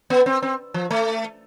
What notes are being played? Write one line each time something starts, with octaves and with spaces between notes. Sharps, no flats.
B3
C4
C4
F3
A3